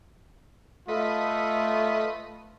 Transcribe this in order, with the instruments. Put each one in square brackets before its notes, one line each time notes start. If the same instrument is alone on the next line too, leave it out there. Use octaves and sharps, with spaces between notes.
[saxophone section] A3 [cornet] F4 [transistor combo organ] B4 D#5